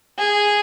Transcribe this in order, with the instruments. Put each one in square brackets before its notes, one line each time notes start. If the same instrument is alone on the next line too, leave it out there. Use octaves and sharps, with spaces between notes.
[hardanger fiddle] G#4